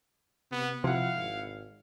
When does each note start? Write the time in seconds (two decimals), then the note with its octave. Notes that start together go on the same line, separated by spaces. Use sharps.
0.52 C3 B3
0.84 C3 F3 E4 F5 F#5
1.16 G#1